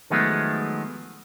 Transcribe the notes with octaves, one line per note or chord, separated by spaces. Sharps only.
D#3 F3 F#3 G#3 A3 B3